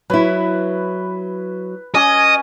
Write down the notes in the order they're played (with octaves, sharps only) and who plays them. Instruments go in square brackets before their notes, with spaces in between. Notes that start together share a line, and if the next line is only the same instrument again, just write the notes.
[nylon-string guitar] F#3 E4 [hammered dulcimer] B4
[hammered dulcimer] C#4 G4 G#5 [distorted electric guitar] D#5